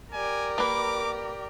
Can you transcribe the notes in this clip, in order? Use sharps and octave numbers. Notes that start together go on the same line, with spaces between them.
G4 A#4 D5 G#5
A#3 B4 D6